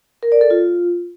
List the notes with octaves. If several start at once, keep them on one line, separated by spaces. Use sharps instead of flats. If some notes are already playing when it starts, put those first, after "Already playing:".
A#4
D5
A4
F4